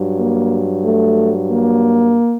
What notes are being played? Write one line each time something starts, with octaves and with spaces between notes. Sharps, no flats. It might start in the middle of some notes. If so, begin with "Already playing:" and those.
Already playing: G2 F#3
A#3
A3
A#3